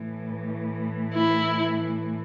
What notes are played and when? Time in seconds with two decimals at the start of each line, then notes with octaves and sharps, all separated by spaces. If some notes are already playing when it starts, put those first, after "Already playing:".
Already playing: A2 E3
1.14 E4